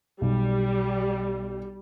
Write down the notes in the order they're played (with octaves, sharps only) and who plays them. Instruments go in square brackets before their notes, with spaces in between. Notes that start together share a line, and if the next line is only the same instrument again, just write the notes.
[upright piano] B1 [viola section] G3